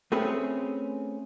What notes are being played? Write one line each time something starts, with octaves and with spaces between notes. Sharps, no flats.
A3 C4 C#4 G#4 B4